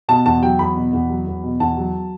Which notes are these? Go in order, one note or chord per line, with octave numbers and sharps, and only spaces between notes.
B2 A5
E2 A5
F#3 G5
E2 B5
B2
E2
F#3
E2
B2
E2 A5
F#3